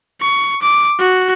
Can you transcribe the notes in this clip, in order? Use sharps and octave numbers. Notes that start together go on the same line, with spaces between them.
C#6
D6
F#4